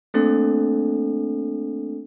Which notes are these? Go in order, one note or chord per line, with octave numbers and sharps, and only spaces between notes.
A3 A#3 C4 D4 A4